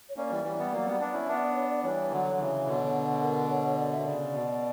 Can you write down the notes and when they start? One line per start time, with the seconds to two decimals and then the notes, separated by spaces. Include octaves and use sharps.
0.09 C#5
0.16 A#3 C#4 D5
0.31 E3 G3
0.44 E3 G3
0.59 G3 B3
0.72 F#3 A#3
0.86 G3 B3
1.00 B3 D4
1.13 C#4 E4
1.27 B3 D4 E5
1.41 D5
1.56 C#5
1.70 D5
1.83 E3 G3 C#5
2.11 D3 F#3
2.39 C#3 E3
2.67 B2 D3
3.22 A#4
3.50 C#5
3.64 C#5
3.78 D5
3.92 E5
3.99 B2
4.06 C#3 D5
4.33 B2